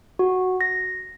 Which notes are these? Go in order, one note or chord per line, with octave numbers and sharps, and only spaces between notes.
F#4
A#6